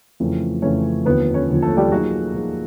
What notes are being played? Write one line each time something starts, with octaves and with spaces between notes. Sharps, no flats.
F2 C#3 E3 A3
F2 C#3 E3 A3 C#4 C#5
D#2 D3 F3 B3 B4
C#4 C#5
D#2 D3 F3
A3 A4
G3 G4
A#2 F3 F#3 A#3 D#4 F#4 G#4
A#2 F3 A#3 D#4 G#4